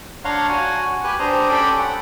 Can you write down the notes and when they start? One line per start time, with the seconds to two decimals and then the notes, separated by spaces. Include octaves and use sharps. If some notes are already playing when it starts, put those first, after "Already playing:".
0.25 D4 C#5 F5 F#5 A#5 C6
0.49 F#4 F#5 G#5
1.04 G4 B4 G#5 F#6
1.20 D4 G4 C5 A#5 D#6
1.49 C#4 G4 A4 G5 B5 D6
1.79 F#5